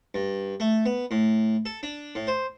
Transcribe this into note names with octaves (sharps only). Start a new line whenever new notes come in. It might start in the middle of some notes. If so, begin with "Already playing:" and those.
G2
A3
B3
A2
A4
D4
A2
C5